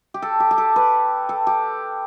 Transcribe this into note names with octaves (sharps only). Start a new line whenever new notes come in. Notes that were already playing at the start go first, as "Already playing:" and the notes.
G4
A4
G4
G4
A4
B4
A4
G4